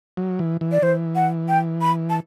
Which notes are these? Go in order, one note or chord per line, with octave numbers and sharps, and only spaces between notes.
F#3
E3
E3
D5
E3 C5
F#5
G5
B5
A5